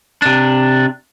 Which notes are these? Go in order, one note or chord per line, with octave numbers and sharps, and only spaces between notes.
C3 D4